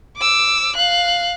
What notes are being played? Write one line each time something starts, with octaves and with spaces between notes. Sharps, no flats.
D6 E6
F5 F#6